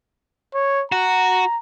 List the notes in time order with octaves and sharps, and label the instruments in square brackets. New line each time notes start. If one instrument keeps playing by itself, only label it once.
[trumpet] C#5
[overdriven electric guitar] F#4 [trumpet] A#5